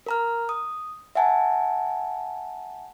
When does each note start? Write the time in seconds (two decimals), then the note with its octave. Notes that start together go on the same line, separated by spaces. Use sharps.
0.06 A#4 A#5 F6
0.49 D#6
1.15 E5 F#5 G#5 A5